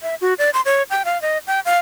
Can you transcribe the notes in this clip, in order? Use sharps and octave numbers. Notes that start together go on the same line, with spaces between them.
E5
F#4
D5
C6
C#5
G5
F5
D#5
G5
F5